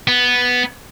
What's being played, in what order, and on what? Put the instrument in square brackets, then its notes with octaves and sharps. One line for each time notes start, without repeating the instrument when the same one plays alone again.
[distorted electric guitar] B3